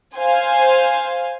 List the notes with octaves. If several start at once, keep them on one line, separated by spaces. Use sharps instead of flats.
C5 F5 G#5